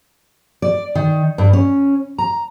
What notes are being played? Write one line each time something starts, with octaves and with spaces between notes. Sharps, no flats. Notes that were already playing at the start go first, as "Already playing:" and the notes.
D5
D#3
G2
C#4
A#5